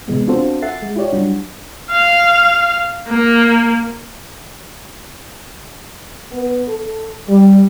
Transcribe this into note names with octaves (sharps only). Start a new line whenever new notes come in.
C3 E3 G#3 B3
C4 D4 F4 F#4 A4 C5
A4 E5 F#5 A6 C7
G#3
E4 F4 G4 C#5 D5
F#3 G3 D4 F#4
F5
A#3
B3
A4
G3